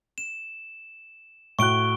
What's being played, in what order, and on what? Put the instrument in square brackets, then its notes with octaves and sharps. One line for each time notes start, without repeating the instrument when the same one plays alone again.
[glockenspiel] E7
[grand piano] A2 F#4 F#6 [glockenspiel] C#6 D7 G7